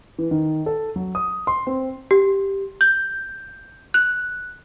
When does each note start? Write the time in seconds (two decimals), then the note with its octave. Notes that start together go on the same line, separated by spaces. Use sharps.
0.18 E3
0.31 D#3
0.66 A4
0.96 F#3
1.15 D#6
1.47 C6
1.67 C4
2.11 G4
2.81 G6
3.94 F#6